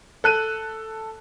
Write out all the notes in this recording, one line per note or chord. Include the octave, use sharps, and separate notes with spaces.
A4 F#6 D#7